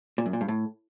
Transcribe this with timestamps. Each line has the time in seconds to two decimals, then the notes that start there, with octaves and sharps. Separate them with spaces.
0.18 A#2
0.26 F#2
0.33 A#2
0.41 G2
0.48 A2